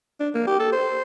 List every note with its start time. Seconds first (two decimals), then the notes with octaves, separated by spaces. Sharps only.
0.20 D4
0.34 A#3
0.47 G4
0.59 A4
0.72 C5